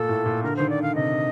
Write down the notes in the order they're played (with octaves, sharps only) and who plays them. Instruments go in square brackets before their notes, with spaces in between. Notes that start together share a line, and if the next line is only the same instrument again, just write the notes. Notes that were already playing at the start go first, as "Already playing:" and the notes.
Already playing: [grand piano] A#2 A3 [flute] A4
[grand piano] A2
A#2
[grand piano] D3 [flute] A#4
[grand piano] D#3 [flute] C5
[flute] D5
[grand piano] D3 [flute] F5
[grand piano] C3 [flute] D#5